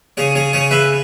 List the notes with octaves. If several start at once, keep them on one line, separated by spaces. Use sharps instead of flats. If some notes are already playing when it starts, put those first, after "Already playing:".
C#3 G#4 C#5
G#4 C#5
C#3 G#4 C#5
B4 E5